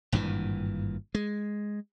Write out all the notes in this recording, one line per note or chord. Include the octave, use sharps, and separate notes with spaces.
G#1 G2 A#2 E3
G#3